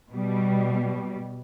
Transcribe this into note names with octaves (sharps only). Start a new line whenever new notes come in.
B2 G3